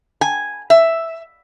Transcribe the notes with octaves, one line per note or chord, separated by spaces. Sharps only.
G#5
E5